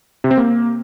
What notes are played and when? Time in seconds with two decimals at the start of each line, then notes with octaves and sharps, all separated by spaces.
0.24 C3
0.31 C4
0.37 A#3